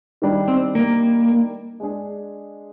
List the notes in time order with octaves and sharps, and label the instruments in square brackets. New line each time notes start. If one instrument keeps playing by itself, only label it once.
[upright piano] D#3 G3 D4
[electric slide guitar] C4
A#3
[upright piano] G#3 D4 G#4